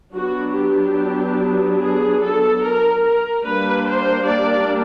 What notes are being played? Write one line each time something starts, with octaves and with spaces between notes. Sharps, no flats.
F#3 B3 D4 F#4
G4
G#4
A4
A#4
A#4
G3 A#3 D4 B4
C5
D5